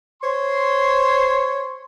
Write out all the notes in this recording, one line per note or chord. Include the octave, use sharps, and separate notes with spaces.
C5 C#5 C6